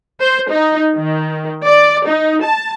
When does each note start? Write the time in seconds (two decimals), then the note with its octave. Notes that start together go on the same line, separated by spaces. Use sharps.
0.21 C5
0.51 D#4
0.95 D#3
1.65 D5
2.07 D#4
2.43 A5